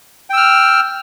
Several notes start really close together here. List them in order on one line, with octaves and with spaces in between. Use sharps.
G5 E6 F6